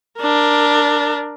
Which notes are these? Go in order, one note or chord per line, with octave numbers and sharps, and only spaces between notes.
D4 A#4